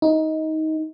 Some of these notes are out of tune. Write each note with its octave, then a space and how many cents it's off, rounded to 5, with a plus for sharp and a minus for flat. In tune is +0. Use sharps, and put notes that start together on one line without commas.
D#4 +20